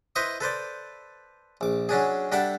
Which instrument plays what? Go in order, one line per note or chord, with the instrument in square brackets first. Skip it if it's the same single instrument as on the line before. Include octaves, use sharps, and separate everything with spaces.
[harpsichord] E4 B4 C5 D#5 C#6 D#6
A4 B4 C5 D5
A#1 D6
F#3 C#4 D4 G#4
G3 D4 A4 D5 E5 F#5